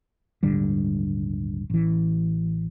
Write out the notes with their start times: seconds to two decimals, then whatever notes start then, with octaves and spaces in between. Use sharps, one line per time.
0.43 D#1 G#1 D3 G3
1.70 A1 E3